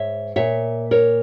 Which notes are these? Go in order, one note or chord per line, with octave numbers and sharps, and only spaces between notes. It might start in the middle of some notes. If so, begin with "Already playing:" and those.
Already playing: G#2 C#5 E5
A#2 C#5 E5
A#4 C#5